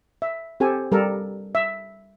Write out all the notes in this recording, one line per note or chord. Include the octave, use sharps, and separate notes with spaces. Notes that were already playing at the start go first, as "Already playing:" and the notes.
E5
C4 G4 A4 G#5
G3 A4 A#4
E5